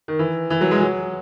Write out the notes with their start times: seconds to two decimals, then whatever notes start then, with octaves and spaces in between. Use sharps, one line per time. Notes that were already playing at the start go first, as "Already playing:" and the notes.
0.08 D#3
0.19 E3
0.50 E3
0.61 F#3
0.71 G#3
0.82 F#3